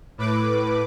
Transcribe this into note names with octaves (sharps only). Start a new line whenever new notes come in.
A2 B4 D6